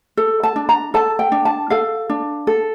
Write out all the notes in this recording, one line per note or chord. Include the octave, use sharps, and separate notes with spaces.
A4
A5
D4
A#5
A4 A5
G5
D4
A5
A4 F5
D4
A4